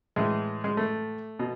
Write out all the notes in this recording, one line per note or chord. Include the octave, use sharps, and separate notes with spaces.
A2 E3 G#3
G#3
A3
B2